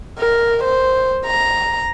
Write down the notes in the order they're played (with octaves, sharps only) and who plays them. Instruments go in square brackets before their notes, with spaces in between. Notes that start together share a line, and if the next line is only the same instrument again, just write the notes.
[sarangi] A#4
C5
A#5